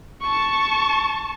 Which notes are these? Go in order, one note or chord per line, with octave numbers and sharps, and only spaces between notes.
A5 C#6